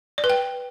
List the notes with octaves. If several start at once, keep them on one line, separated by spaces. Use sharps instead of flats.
D5
B4
G5